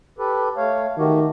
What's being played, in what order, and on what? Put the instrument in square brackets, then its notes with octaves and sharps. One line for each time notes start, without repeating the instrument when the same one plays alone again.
[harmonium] G4 A4 B4
A3 C#5 F5
[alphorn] D#3 [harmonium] A3 F#4 G4